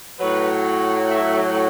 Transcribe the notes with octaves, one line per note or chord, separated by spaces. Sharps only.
A2 F#3 B4
E5